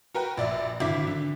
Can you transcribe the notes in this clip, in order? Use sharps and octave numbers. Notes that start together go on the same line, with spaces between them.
F#4 A#4 B4 G5
A#1 D5 E5
G#1 D3 E4 D6 B6
D3